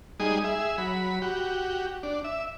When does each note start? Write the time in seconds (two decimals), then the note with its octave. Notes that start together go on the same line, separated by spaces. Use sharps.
0.20 G3 G#3 D#4 G#4 D#6
0.44 G#4 E5
0.78 F#3 B5
1.22 F#4 G4
2.03 D4
2.24 E5